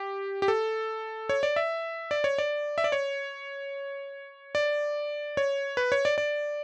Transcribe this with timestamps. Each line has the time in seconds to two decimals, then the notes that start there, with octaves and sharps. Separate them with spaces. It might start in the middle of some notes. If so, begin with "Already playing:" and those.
Already playing: G4
0.42 G4
0.48 A4
1.29 C#5
1.43 D5
1.56 E5
2.11 D5
2.24 C#5
2.38 D5
2.78 E5
2.84 D5
2.92 C#5
4.55 D5
5.37 C#5
5.77 B4
5.92 C#5
6.05 D5
6.18 D5